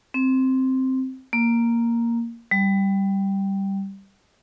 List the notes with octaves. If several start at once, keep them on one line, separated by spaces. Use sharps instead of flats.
C4
A#3
G3